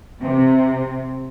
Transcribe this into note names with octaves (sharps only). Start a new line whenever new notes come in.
C3